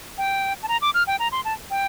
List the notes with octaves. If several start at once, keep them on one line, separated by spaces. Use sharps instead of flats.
G5
A5
A#5
D6
F6
G5
A#5
C6
A5
G5